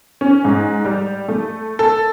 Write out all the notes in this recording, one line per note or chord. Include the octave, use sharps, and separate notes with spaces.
C#4
G#2
G3
A3
A4